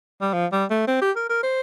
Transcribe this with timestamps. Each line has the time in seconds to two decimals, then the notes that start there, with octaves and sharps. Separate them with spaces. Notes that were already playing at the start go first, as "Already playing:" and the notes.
0.21 G3
0.33 F3
0.52 G3
0.70 A3
0.88 C4
1.01 G4
1.16 A#4
1.29 A#4
1.43 C5